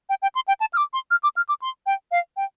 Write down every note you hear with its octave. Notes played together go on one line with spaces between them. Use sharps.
G5
G5
C6
G5
A5
F6
D6
C6
F6
D6
F6
D6
C6
G5
F5
G5